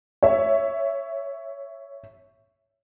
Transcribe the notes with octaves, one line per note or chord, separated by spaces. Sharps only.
C#5 E5